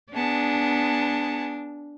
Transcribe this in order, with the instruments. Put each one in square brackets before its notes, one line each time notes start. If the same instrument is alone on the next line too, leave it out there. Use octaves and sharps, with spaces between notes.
[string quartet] B3 G#4 A5 [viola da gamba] D4